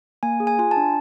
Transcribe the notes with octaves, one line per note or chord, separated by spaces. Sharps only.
A#3 G#5
G#4
G#5
F4 G#5
A5
D4